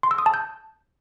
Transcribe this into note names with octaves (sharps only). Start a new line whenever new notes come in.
C6
E6
D#6
A5
G6